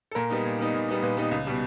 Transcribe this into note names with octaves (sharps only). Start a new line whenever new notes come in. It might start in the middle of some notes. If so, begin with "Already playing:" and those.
A4
A#2 A#4
G3 B3 D#4
A#2
G3 B3 D#4
A#2
G3 B3 D#4
A#2 B4
G3 B3 D#4
C#2
B2 G3